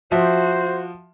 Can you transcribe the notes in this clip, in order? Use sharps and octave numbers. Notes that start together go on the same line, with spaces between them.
F3 F#4 C5 E5